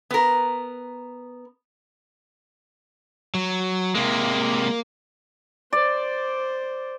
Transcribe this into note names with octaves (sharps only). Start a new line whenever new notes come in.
B3 A#4
F#3
C3 G#3 A#3
C5 D5